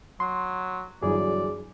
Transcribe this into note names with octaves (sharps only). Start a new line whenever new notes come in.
F#3 C6
G1 E3 F#3 G#4 D5